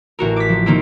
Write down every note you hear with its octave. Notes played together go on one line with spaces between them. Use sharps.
A1 F#4 A#4
D6 B6
F3
D#3 A#3 C4